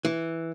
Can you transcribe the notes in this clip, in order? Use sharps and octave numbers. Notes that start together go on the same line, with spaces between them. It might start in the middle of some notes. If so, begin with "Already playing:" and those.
E3